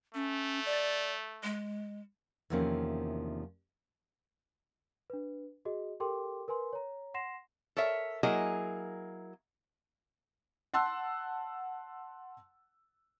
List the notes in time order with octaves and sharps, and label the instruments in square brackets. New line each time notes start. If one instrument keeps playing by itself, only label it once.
[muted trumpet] A3 [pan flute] C#4
[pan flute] D5
G#3
[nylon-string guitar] E2 C3 D#3 F3 A#3 C#4
[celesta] D4 B4
F#4 G#4 D#5
G4 A4 A#4 G5 C6 D6
A#4 B4 G#5 C6
C#5 A#5
F#5 C6 A#6 C7 E7
[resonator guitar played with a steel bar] A4 A#4 C#5 E5
F#3 A#3 E4 G#4 A#4 D#5
[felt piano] F#5 A5 C6 E6 F#6